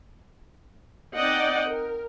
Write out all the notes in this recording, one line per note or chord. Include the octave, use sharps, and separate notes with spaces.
C4 D#4 D5 D#5 F#5 G5
A#4